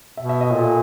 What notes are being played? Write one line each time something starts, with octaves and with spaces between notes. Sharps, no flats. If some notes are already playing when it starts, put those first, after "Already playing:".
B2 E5
E5
D#5
A#2 A4